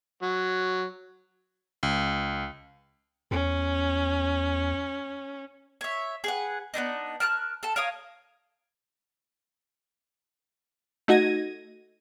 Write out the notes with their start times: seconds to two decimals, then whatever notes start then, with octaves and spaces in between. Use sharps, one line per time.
0.22 F#3
1.83 C#2
3.31 E2 C#4
5.81 C#5 E5
6.24 G#4 B4 F#5
6.74 B3 C4 D4 D#4
7.20 A#4 A5 F6 F#6
7.63 A4 A5
7.76 A#4 C#5 F5 D#6
11.08 A3 D#4 F#4 G#6 A#6 D#7